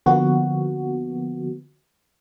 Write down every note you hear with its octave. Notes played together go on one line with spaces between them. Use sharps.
D3 F3 A#3 B3 F#4